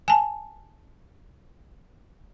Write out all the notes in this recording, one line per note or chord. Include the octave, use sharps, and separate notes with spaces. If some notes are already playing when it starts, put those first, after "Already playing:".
G#5 A5